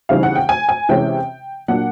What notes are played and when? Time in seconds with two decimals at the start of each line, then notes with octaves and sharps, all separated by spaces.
0.09 C#3 E3 G3 C4 D#4 F5
0.23 F#5
0.35 G5
0.49 G#5
0.69 G#5
0.89 C3 E3 G#3 C#4 G5
1.68 A#2 F#3 A#3 D4 F#5